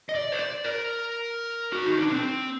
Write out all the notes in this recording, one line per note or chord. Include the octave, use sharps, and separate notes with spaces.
D#5
D5
C5
D5
A#4
F#4
D#4
D4
C4